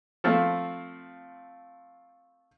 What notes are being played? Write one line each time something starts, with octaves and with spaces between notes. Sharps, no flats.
F3 A3 C4